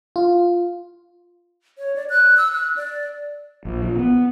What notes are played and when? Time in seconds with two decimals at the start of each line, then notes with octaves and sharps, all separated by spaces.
0.16 F4
1.78 C#5
1.96 D5
2.10 F#6
2.37 E6
2.52 F#6
2.76 D5
3.65 A#1
3.82 A#2
3.99 B3